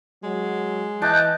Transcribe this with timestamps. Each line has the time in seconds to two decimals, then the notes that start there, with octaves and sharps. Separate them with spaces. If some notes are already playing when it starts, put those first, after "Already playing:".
0.23 F#3 G#3
1.02 E3 D#5 A5 D6 F#6 G6